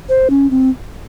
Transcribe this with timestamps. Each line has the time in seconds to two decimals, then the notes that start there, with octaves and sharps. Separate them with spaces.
0.09 C5
0.30 C#4
0.51 C4